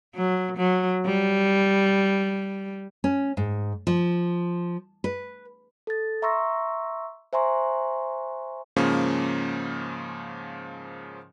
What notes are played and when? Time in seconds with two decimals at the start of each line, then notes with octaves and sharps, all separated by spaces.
0.15 F#3
0.57 F#3
1.06 G3
3.04 C#4
3.37 G#2
3.87 F3
5.04 B4
5.87 A4 A6
6.22 E5 A#5 C6 C#6 E6 A#6
7.33 C5 E5 G#5 A#5 C6 C#6
8.76 G#2 C#3 F3 A#3 C#4